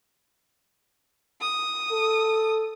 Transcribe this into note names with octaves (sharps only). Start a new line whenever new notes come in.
D#6
A4